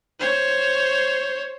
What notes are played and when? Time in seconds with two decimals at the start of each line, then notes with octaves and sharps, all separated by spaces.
0.20 C5 C#5